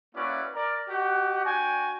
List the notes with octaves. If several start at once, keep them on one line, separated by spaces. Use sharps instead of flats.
A#3 C#4 E4 F#4 B4 D5
A#4 D5
F#4 G4 D#5 F#5
D4 F#4 G5 G#5